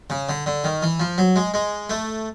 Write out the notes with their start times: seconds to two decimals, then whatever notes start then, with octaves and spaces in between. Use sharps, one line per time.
0.10 C#3
0.29 D3
0.46 D3
0.64 D#3
0.82 E3
1.00 F3
1.18 F#3
1.36 G#3
1.54 G#3
1.90 A3